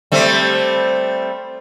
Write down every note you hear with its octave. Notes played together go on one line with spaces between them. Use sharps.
G3 A3 C4